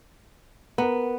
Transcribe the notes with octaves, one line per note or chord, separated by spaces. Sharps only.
B3 A#4 A#5